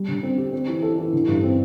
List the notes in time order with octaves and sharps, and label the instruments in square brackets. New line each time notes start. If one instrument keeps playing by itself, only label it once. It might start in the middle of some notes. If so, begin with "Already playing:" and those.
Already playing: [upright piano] G3
D3
C4
G4
C4
E3
A4
E3
D3
G2
C4